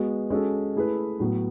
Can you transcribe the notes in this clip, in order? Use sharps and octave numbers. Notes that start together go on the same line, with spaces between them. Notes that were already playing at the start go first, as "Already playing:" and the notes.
Already playing: G#3 B3 F#4
G#3 C#4 F#4 A4
A3 E4 G#4 B4
A2 F#3 B3